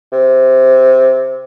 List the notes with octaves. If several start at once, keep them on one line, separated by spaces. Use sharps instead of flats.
C3